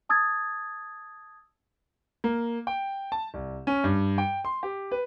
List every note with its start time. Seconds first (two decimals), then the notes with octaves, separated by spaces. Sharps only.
0.09 A5 D#6 E6 G#6 A6
2.24 A#3
2.67 G5
3.12 A5
3.34 C2
3.67 C#4
3.84 G2
4.18 G5
4.45 C6
4.63 G4
4.92 B4